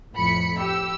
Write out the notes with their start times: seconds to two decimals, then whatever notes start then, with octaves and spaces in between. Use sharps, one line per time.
0.14 F2 A2 B5 C#7
0.58 G4 E6